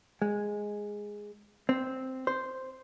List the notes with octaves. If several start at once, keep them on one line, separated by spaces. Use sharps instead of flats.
G#3
C4
C5